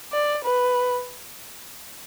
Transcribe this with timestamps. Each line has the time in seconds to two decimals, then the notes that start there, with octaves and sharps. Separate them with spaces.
0.13 D5
0.45 B4